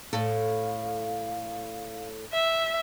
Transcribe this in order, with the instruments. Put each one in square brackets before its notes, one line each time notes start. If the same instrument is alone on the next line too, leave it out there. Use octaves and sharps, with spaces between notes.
[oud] A2 A4 [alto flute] F5
[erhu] E5